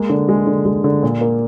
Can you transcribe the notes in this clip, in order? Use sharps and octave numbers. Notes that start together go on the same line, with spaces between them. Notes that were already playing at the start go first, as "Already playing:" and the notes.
Already playing: G#3 A#3
D3
G#3
D3
G#3
D3
A#2
A#3